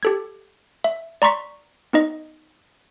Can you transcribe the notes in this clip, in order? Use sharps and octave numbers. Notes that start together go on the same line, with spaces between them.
G4 A4 G#6
E5
D5 A#5 C6 C#6 B6
B3 D#4 D#5